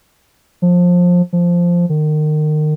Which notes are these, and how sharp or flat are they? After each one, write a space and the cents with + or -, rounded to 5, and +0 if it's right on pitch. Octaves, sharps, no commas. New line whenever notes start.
F3 +20
F3 -5
D#3 -30